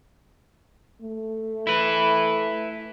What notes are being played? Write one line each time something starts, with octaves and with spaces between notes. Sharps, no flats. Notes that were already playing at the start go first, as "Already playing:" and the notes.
A3
E4 B4